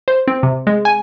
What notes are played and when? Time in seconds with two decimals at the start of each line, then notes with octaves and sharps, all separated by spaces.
0.08 C5
0.28 C4
0.43 C3
0.67 G#3
0.85 G#5